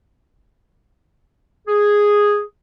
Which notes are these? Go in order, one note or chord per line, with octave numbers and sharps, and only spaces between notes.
G#4